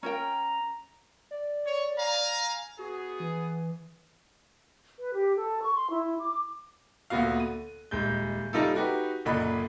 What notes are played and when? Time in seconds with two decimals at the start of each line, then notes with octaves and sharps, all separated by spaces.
0.03 C#4 A#4 G5 A#5
1.31 D5
1.66 C#5
1.98 F5 G#5 A#5
2.79 B3 F#4 G#4
3.20 E3
4.98 B4
5.14 G4
5.36 A4
5.61 C#6
5.74 C6
5.90 E4
6.19 D6
7.10 D2 A#2 B3 F#4 F5
7.40 D#7
7.91 D#1 G#3 G6
8.53 G3 D#4 F4 A4
8.75 D#4 F#4 G4 B4
9.25 F#1 A#2 D3 D#5 B5